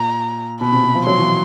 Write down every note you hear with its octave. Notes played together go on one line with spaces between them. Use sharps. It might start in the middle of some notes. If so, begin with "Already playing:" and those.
Already playing: A#2 A#5
B2 B5
C3
C3
F3
F#3 C6
E3
F3